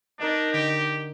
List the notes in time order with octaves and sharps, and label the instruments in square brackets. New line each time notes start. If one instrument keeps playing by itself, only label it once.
[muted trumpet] D4 [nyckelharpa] D#4 [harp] A#4 D#5 F#5
[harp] D3 [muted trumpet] G4